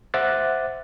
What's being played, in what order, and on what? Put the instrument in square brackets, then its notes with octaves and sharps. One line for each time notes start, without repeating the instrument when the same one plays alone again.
[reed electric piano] C5 E5 F#5 D6 F#6 A6